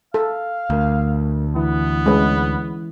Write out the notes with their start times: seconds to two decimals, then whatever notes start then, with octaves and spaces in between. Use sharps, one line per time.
0.14 A4 F5
0.70 D2 A3 A#4
1.56 E3 B3 E4
2.06 G#3 C#4 B4